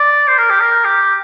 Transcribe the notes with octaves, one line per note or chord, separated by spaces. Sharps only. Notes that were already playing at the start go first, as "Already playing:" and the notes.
Already playing: D5
C5
A#4
G4
A#4
G4